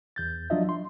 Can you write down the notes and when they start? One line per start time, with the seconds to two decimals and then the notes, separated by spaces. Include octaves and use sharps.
0.16 E2 G6 A6
0.50 F3 F#3 D4 F4 D#5 E5
0.69 C6